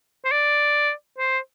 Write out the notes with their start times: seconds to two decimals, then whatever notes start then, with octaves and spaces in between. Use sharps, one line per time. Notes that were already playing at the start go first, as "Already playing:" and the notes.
0.25 C5
0.32 D5
1.18 C5